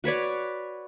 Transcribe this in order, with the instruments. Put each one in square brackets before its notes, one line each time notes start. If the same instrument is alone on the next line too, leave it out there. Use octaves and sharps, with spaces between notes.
[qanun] F#4 B4 C#5 D5